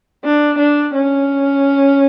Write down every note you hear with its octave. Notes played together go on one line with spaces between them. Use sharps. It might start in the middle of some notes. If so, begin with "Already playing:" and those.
D4
D4
C#4